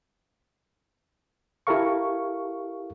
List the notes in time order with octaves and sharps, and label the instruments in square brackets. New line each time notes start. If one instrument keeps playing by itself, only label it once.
[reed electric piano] E4 G4 A4 A#4 F5 C#6